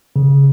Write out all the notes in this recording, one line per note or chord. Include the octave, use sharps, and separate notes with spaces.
C#3